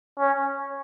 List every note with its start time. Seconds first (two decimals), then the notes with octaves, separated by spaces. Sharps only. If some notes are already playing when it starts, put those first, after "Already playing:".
0.19 C#4